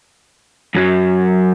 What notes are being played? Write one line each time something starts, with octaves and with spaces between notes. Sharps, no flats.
F#2 F#3